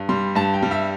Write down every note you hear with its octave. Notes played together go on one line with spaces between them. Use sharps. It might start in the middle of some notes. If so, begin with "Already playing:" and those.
Already playing: G2
G3 C6
G2 A5
G5
G3
E5